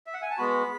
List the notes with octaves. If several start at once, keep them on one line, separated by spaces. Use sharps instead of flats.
E5
F#5
G#5
A5
G#3 B3 F#4 B5